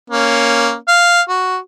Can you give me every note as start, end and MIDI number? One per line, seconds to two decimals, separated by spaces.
0.10 0.75 58
0.10 0.75 61
0.88 1.21 77
1.29 1.59 66